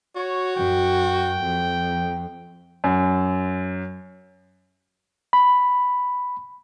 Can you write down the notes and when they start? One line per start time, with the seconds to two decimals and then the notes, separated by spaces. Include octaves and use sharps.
0.16 F#4 C#5
0.56 F#2 G5
1.41 F2
2.84 F#2
5.33 B5